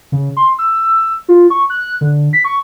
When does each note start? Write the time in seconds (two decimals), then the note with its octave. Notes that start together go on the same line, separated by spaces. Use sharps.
0.12 C#3
0.37 C6
0.59 E6
1.29 F4
1.50 C#6
1.70 F#6
2.01 D3
2.33 B6
2.44 C#6